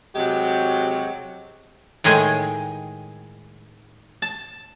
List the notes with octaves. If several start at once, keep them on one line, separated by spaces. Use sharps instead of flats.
C3 F#3 G#3 F#4 G4
A2 D#3 G#3 G#4 G5 G#5
A5